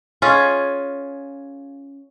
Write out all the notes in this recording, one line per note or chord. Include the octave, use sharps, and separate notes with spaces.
C#4 F4 G#4